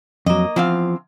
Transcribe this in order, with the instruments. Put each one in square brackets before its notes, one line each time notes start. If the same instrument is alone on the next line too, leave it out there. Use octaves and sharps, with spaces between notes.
[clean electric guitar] F2 F#3 [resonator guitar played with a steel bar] A#3 D#5
[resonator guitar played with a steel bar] E2 C4 F5 [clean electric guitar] F3